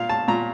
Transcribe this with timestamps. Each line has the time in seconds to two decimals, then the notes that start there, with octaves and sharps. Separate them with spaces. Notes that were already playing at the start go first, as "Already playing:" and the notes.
Already playing: A#2 F5
0.09 A5
0.28 A#2 A#5